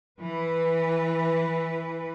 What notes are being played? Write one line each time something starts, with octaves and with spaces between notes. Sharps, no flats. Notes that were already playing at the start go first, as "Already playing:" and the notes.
E3 B4